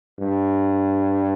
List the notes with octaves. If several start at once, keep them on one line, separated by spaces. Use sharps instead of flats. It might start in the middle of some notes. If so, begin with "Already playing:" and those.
G2